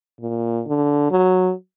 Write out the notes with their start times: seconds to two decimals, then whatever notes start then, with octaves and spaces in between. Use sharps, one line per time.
0.21 A#2
0.67 D3
1.11 F#3